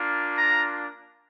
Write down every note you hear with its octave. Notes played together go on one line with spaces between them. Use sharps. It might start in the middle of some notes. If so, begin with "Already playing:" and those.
Already playing: A#3 D4 F4
A#5